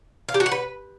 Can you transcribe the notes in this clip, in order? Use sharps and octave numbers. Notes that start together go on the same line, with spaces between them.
F5
G4
F#4
F#5
B4